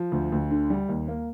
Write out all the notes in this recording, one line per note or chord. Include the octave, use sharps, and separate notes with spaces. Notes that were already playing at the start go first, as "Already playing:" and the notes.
Already playing: F3
D2
D2
D3
G3
D#2
A#3